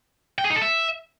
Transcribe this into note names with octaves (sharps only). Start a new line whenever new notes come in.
G5
G#4
D#4
A4
E5